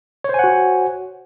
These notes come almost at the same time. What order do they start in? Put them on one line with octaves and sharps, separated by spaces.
C#5 C5 G#5 F#5 F#4